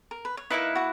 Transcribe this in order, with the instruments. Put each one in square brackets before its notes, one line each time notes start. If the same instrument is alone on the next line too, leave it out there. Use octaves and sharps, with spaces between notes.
[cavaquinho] A#4
B4
C#5
[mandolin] A#3 E4 B4 [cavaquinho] D#4 D#5
[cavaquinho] F#4 F#5